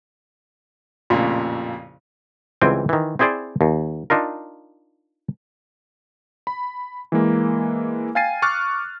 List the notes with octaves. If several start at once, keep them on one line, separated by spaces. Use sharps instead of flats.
A1 F2 A#2 C#3
C#2 E3 G3 C4 G5 G#5
D#3 E3
C4 E4 G#4 C5 D5
D#2
D4 D#4 F4 A#4
B5
E3 G#3 A#3
F5 G5 G#5 A6 C7 D#7
C#6 D6 F6 F#6 A6